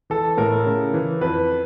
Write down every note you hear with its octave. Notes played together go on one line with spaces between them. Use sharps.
E3 A4
A2 A#4
C#3
E3
F2 B4